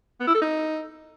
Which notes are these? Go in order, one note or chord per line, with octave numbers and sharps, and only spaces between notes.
B3
E4
A4
D#4